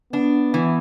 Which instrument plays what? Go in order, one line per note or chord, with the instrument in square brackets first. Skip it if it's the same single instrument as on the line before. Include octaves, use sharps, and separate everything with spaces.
[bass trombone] B3 [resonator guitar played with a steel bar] D4
[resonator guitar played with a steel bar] E3